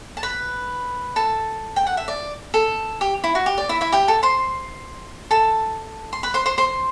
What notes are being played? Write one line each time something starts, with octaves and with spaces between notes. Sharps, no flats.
A5
B4 B5
A4 A5
G5
F#5
E5
D5
A4
G4
E4
F#4
G4
D5
E4 E5
E4 E5
G4 G5
A4 A5
C5 C6
A4 A5
C6
B4 B5
C5 C6
C5 C6
C5 C6